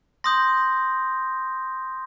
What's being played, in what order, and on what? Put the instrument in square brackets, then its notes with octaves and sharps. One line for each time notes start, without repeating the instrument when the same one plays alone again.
[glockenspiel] C6 D#6 G6 A#6